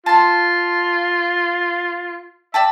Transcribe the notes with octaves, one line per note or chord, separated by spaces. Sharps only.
F4 A5 C6
D5 E5 G5 A5